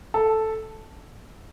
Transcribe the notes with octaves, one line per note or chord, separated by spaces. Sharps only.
A4